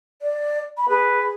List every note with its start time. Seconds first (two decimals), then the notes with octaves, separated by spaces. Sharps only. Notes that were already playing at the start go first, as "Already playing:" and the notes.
0.22 D5
0.77 B5
0.89 G#4 B4